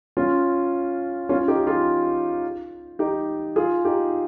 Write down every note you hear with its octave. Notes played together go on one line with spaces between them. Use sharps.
C#4 F4
C#4 F4
D#4 G4
F4 G#4
D#4 G4
F4 G#4
D#4 G4